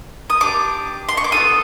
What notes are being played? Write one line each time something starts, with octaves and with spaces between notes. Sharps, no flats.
D#6
D4 G4 D6
C6
C#6
D6
B3 E4 A4 D#6